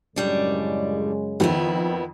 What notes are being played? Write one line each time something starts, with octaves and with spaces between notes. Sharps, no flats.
F#2 A2 C#3 G3 G#3 D4
F2 D#3 B3 C4 E4